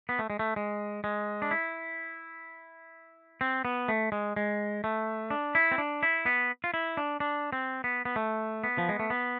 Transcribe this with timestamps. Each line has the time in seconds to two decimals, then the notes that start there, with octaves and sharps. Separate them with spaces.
0.09 B3
0.19 A3
0.30 G#3
0.39 A3
0.56 G#3
1.04 G#3
1.42 D4
1.51 E4
3.41 C4
3.65 B3
3.88 A3
4.12 G#3
4.36 G#3
4.84 A3
5.30 D4
5.55 E4
5.71 C4
5.78 D4
6.03 E4
6.26 B3
6.64 F4
6.74 E4
6.97 D4
7.20 D4
7.52 C4
7.84 B3
8.05 B3
8.16 A3
8.64 B3
8.78 F3
8.89 G#3
8.99 A3
9.10 B3